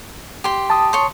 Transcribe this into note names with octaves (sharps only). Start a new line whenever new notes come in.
G4 C6
A5 D#6
C#5 C6